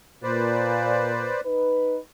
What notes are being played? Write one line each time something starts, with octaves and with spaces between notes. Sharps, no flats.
A#2 B4 C5 D5
D#4 B4